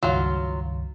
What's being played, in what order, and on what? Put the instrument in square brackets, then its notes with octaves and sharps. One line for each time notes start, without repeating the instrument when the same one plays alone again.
[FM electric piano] C#2 G2 D#3 [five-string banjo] F#3 F4